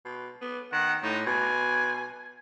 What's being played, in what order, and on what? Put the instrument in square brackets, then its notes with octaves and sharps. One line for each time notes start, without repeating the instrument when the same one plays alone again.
[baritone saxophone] B2
B3
[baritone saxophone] D#3 [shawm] F#5
[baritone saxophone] A2 [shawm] D#4
[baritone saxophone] B2 [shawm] G#5